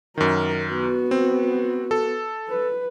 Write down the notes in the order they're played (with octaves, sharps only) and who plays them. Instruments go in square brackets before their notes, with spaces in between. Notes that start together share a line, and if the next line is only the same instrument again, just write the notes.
[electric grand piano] F#2 D#3 [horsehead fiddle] A#4
[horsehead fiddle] B3 F#4
[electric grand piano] C4
A4
[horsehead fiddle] B4